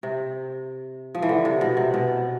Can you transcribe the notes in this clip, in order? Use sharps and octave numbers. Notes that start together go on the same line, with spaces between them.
C3
F3
E3
D3
C3
B2
C3
B2